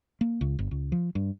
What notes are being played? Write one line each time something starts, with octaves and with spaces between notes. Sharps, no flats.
A#3
C#2
G1
C#2
F3
G2